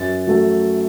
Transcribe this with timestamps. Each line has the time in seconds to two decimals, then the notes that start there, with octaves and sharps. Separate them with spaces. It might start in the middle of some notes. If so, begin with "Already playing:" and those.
Already playing: F#2 A6
0.27 F#3 A3